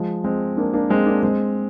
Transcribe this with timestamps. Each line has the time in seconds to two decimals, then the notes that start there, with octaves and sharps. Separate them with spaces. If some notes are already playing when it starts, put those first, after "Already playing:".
Already playing: F3 G#3
0.24 G#3 C4
0.57 A#3 D4
0.73 A#3 D4
0.89 G#3 C4
1.06 A#3 D4
1.22 G#3 C4